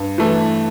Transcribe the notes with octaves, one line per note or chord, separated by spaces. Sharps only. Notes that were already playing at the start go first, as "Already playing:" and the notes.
Already playing: G2
E3 A3